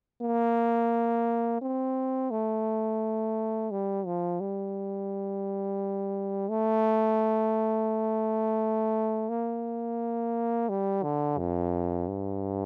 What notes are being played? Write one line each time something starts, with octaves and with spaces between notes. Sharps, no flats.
A#3
C4
A3
G3
F3
G3
A3
A#3
G3
D3
F2
G2